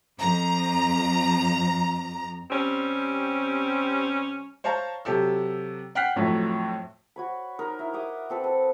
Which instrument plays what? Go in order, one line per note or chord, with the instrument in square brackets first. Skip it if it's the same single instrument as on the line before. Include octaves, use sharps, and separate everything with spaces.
[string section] F2 A#5
[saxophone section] C3 G3 C4 C#4
[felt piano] C5 C#5 F5 A5 A#5
C3 F#3 G4 A4 E6
F#5 G5 F6 F#6 B6 C7
F2 A2 F#3 A3
[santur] F#4 C#5 B5
D#4 A#4
E4
D#5 E5 D6 D#6
C4 A4 B4
A4